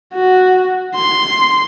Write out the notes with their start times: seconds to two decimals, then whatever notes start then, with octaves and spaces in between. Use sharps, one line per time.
0.14 F#4
0.95 C6